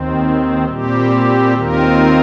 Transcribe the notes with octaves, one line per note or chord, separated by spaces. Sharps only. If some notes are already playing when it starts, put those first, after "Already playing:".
Already playing: D#2 D#3 C4
A#2 G3 C4 G4
D#2 D#3 C4 F4 A#4